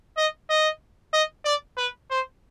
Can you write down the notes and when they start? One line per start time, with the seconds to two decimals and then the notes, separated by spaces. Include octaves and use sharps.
0.17 D#5
0.50 D#5
1.13 D#5
1.45 D5
1.77 B4
2.10 C5